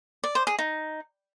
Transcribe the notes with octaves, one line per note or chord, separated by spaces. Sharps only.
D5
C5
G#4
D#4